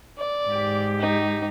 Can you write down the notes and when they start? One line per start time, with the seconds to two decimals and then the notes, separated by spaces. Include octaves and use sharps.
0.18 D5
0.48 G#2 G4
1.00 D#4